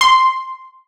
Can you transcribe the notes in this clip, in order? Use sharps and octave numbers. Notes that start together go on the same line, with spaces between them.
C6